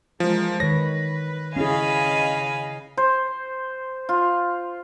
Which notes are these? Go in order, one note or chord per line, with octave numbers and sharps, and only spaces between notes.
E3 F3 G#3 A#3
D#3 B4 C#5 A#6
C#3 C#4 E4 G#4 D#5 F5 G#5 B5
C5
F4